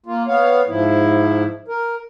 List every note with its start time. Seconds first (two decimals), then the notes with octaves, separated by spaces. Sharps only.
0.06 A#3 F4
0.27 B3 C#5 F5
0.68 G#2 F3 E4
1.68 A#4